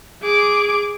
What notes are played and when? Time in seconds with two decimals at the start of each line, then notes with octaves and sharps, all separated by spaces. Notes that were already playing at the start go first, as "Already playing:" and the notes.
0.22 G#4 D6